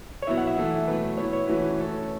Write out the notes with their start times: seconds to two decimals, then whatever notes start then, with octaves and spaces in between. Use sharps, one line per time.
0.22 C#5
0.27 B2 F#3 B3 E4 E5
0.38 F#5
0.47 E5
0.58 E3 A3 E4 A4
0.87 B2 F#3 A3 B4
1.17 B2 B3 E4 C#5
1.33 C#5
1.47 E3 A3 C#4 F#4 B4
1.78 A3 C#4 A4 C#5